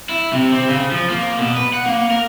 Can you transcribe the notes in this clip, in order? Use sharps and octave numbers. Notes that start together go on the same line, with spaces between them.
E4
C3
C4
C#3
F3
A#3
B2
B4
F#5
A#3
A#4